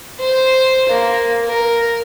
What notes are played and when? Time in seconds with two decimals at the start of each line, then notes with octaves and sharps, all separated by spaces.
0.20 C5
0.89 A#3
1.48 A#4